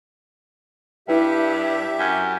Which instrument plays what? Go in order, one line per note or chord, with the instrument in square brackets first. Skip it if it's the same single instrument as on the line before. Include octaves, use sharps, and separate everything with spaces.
[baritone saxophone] G2 [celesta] E4 B4 G5 [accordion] G4 E5
[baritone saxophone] F#2